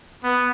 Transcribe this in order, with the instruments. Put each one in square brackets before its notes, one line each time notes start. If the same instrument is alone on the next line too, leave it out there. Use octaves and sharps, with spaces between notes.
[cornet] B3